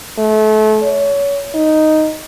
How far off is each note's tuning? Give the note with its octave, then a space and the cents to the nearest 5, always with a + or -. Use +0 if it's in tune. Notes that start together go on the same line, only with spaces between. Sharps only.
A3 -30
C#5 +25
D#4 +0